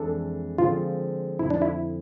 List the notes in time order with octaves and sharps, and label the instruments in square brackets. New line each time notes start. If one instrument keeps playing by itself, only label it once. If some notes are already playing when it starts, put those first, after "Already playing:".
Already playing: [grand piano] F2 E3 G#3 D4 [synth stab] A4
[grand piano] D3 F3 G#3 C4 [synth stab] F4
[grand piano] F2 D3 F3 [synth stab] E4
[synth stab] D4
E4